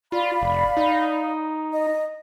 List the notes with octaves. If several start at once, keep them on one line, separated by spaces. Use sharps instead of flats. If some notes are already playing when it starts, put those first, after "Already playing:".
F4 D5 F5 B5
F1
D#4
D#5